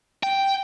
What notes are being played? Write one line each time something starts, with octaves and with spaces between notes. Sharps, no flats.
G5